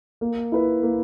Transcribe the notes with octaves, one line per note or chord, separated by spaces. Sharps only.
A#3
E4 B4
A#3